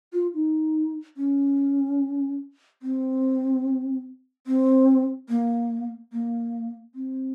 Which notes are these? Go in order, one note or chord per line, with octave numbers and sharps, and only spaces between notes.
F4
D#4
C#4
C4
C4
A#3
A#3
C4